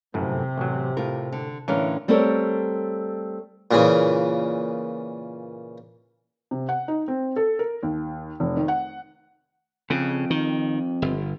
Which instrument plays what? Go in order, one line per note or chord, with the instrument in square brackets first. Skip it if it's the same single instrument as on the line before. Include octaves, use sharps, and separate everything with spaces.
[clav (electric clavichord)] G1 F#2 A2 [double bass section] C3
[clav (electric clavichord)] A1 F#3
[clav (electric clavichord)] A2 [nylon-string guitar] F4 A#4
[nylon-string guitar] D3
[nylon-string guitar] A2 D3 C#4 [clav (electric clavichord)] E3 A#4 F5
[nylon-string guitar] G3 A3 C4 A4 A#4 C#5
[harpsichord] A#2 C#3 E3
[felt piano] C3
F#5
D#4
C4
A4
A#4
D#2
F1
D#3
F#5
[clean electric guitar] F2 [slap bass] C#3
[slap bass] D#3
G1